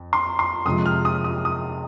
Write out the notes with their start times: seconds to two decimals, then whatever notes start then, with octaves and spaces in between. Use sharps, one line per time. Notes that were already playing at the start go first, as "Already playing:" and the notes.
Already playing: F2
0.13 C6
0.39 C6
0.65 F2 C3 F3 G#3 D#6
0.86 F6
1.05 D#6
1.24 D#6
1.45 D#6